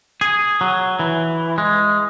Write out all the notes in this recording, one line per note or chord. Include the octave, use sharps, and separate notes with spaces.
G#4
F#3
E3
G#3